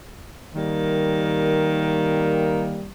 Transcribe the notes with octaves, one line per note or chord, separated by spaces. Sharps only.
D#3 G3 A#3